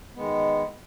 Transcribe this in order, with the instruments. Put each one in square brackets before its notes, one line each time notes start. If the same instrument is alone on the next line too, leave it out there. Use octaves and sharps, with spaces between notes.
[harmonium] D#3 G#3 B3